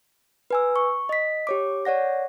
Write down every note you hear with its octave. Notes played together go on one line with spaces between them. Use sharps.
B4 G#5 E6
C#6
D#5 B6
G4 C#5 D6
C#5 D5 F#5 A#6